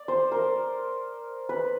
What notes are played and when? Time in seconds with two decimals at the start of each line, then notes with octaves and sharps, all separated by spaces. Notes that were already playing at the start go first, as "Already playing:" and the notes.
Already playing: D5
0.08 C5
0.32 A#4
1.49 B4